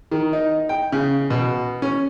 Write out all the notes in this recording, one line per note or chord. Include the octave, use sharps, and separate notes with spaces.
D#3
D#4
G5
C#3
B2
C#4